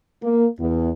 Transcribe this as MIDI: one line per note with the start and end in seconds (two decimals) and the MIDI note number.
0.23 0.46 58
0.60 0.89 40